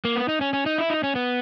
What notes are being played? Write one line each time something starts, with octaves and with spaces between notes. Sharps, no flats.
A#3
B3
D#4
C#4
C#4
D#4
E4
D#4
C#4
B3